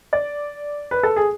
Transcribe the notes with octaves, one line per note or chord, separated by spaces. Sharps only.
D5
B4
A4
G#4